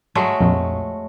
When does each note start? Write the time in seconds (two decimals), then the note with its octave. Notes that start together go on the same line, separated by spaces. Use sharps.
0.15 F#3 G#3 A3
0.40 A#1 F2